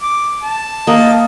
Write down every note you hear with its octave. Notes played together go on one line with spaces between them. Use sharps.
D6
A5
A#3 D#5